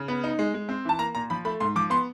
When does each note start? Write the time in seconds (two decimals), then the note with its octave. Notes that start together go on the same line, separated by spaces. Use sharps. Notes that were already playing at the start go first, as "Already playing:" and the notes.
Already playing: C#3
0.08 B3
0.24 D#4
0.39 G#3
0.54 G#3
0.69 C4
0.85 E3 A5
0.99 A#3 A#5
1.15 A#2 A#5
1.30 F3 B5
1.45 A3 B5
1.60 G#2 C6
1.76 F3 D6
1.90 B3 C6